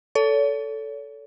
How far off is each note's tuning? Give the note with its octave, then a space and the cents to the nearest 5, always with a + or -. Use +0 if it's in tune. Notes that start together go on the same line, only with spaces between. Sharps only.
A4 +0 C#5 +40